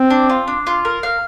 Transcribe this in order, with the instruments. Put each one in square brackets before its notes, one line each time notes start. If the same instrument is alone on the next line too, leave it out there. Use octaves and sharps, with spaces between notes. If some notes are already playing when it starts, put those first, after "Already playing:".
Already playing: [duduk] C4
[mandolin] D4
F4
D4
F4
A#4
F5